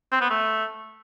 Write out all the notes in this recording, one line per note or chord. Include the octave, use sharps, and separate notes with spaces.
C4
B3
A3